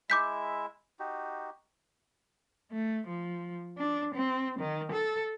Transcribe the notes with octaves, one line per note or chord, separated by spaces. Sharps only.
G#3 E4 E5 D6 G6 B6
D#4 F#4 G4
A3
F3
D4
C4
D#3
A4